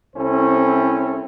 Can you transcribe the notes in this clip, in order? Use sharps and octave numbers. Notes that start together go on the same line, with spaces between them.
C2 C4 C#4 E4 A4 C5